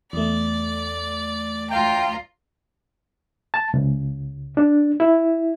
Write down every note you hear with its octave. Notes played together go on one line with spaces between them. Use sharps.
E2 A3 D5
D2 F4 G5 A#5
A5
C#2
D4
E4